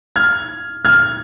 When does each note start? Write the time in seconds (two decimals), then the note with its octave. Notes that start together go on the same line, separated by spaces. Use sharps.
0.16 F6 G#6
0.85 F6 G#6